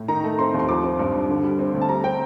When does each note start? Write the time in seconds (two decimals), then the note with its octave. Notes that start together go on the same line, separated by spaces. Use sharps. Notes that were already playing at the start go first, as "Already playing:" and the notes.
Already playing: A2
0.08 D#3 A#5
0.24 A3
0.39 C4 C6
0.54 D#2
0.59 C6
0.69 F3 D6
0.84 C4
0.99 G2
1.14 G2
1.29 D3
1.44 G3
1.59 C4
1.74 D2
1.81 A5
1.89 G3 A#5
2.04 C4 G5